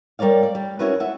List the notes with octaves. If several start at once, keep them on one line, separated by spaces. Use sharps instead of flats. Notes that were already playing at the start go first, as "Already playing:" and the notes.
G3 A#4 C#5 D5 F5
D5
G3
C#4 E4 F#4 A#4 B4
E5 F#5